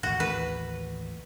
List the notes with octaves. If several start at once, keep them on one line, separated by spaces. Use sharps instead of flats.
A1 D#2 F#4
B4